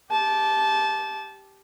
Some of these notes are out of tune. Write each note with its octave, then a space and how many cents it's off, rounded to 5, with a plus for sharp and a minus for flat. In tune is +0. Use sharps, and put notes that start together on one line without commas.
G4 +0 A5 -20